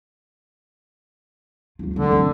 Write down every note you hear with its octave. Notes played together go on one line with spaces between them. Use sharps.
D#2 F4
D3 D#3
F#2 C4